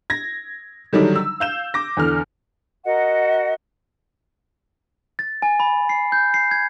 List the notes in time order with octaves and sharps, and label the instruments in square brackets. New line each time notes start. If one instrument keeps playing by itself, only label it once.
[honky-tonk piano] G#6 A#6
D3 D#3 F#3 G3 D4 D#4
E6
F5 G6 E7
D6 A#6
E2 D3 F6
[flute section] F#4 A#4 D#5 F#5
[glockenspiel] A6
G#5
B5
C7
G6
C7
G#6